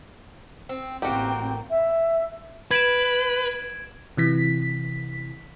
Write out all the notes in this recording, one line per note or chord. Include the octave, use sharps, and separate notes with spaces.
C4
A1 A#3 C4 F#4 G4 G5
E5
B4 G#6 D7 E7
C3 E3 B6